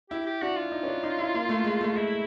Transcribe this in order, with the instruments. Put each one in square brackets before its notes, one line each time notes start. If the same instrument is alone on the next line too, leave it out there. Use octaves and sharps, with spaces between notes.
[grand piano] E4 [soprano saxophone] G4
[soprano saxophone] G4
[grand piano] D4 [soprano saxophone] F#4
[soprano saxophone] F4
[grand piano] D#4
C#4
D4
D#4
E4
A#3
A3
G#3
A3
[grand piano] G#3 [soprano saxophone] E4